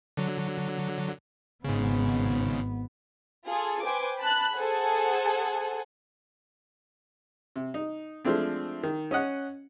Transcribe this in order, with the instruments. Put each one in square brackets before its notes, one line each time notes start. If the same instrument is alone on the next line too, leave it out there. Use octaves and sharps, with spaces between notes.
[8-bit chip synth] D3 F#3
[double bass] G#1 B3 [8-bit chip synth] G#2 C#3
[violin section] F4 G#4 A4
B4 C5 G5 G#5 D6
A5 B5 F#6
G#4 A4 C5 F#5 G#5
[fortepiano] C3
D#4
F3 G#3 A3 C4 D4
D#3
C#4 D#5 F#5